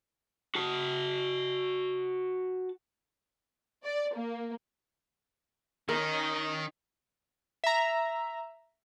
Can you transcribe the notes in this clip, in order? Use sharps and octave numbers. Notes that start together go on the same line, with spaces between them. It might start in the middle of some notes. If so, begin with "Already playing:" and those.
F#4 A5
D5
A#3
D#3 C#4 D#4 A#4 D#5
E5 A#5